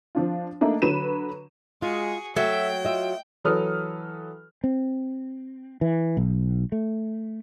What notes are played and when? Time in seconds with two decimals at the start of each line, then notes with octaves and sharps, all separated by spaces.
0.15 F3 D4 F4
0.61 A3 A#3 D4 D#4
0.82 D3 F#3 B4 D#7 E7
1.82 G#3 F4 F#4 G#4
2.36 F#3 A3 E5 G5
2.85 F4 D#5 E5
3.44 E3 F#3 A4 B4 D#6 F6
4.64 C4
5.81 E3
6.17 B1
6.72 A3